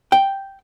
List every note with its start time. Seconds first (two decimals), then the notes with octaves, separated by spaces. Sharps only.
0.12 G5